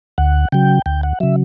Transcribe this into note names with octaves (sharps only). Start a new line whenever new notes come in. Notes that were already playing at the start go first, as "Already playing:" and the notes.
D2 F#5
C#3 F#3 G5
D2 G5
F#5
C#3 F#3 E5